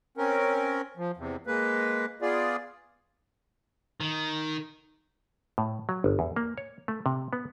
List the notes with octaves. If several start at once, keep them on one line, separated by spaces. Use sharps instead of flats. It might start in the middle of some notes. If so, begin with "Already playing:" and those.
C4 C#4 A#4
F3
E2 C3
G#3 A#3 B4
B3 F4 G#4 D5
D#3
A2
F#3
G1
E2
A#3
C#5
A3
C3
B3